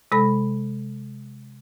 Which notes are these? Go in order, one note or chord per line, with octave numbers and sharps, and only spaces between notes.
C3 G#3 A4 B5 A#6